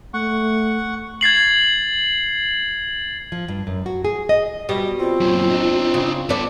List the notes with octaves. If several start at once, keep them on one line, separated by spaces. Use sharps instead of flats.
A3 F#5 C#6
G#6 A6 C7 F#7
F3
G2
F#2
F#4
G#4
D#5
B2 G3
C4 F4
F#2 A#2
D4 D#4
C#3
B3 A4 B4 D5